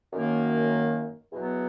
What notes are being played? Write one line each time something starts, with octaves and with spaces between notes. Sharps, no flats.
F#2 D#3 A#3
E2 B2 F#3 B3